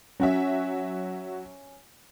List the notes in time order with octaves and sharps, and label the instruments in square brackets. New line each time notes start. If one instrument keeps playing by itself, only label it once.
[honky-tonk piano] F#3 F#4 E5 [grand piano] C#4